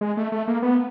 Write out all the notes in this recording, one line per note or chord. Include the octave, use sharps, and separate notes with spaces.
G#3
A3
A3
A#3
B3